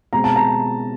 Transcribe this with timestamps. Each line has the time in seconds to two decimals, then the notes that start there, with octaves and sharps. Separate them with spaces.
0.13 B2 G#3 C4 A#5
0.24 A5
0.36 A#5